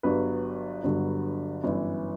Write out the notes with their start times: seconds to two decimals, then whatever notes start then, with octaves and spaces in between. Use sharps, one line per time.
0.03 G1 G2 F#3 B4
0.84 G1 G2 D3 F#3
1.64 G1 F#2 E3